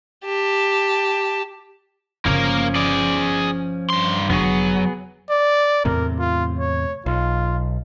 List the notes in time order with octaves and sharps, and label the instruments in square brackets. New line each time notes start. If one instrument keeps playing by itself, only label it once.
[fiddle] G4 A5
[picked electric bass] G1 C#3 [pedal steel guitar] F3 C#4 [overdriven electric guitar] A#3 A#4
[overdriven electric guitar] G#4 D5
G2 C6
[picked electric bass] F1 D3 D4 [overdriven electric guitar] F#3 [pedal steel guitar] B3 G#4
[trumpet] D5
[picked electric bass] E2 A2 C3 [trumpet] A#4
[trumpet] F4
C#5
[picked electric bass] B1 [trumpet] F4